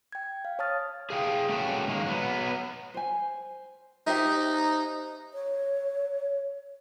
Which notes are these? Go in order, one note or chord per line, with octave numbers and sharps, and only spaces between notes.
G5 G#6
F5
C#5 F5 A5 D#6 F6 A6
G#4 F5 G5
A3 A#3 C#4 F#4 G5
D#3 G#3 A#3
F#3 B3
C5 G#5
D#4 G4 C5 E5
C#5